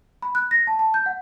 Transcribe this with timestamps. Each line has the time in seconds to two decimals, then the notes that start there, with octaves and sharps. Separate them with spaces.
0.22 B5
0.35 F#6
0.51 A#6
0.67 A5
0.79 A5
0.94 G6
1.06 F#5